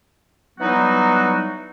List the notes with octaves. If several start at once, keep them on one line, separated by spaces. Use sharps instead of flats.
E3 F#3 G3 B3 D#4 F#4